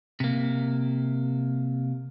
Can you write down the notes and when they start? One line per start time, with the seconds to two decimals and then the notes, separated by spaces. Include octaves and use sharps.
0.20 C3 A#3